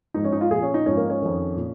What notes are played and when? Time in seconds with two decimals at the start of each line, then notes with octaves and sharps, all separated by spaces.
0.14 G#2 F3 D#4
0.24 C#4
0.32 D#4
0.41 F4
0.51 A#2 F3 G#4
0.63 C#4
0.74 D#4
0.86 G#2 F3 C#4
0.97 A#3
1.10 C#4
1.22 F2 D#3
1.57 A#2